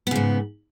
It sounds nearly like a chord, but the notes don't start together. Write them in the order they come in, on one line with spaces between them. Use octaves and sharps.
B3 C#3 G#2